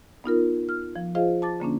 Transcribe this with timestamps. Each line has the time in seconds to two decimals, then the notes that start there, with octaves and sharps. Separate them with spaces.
0.24 B3 D#4 F4 A#4
0.69 F6
0.96 F3
1.15 F4 G#4 C5 D#5 F5
1.42 A5 D6 A6
1.60 D3 A#3 C#4 D4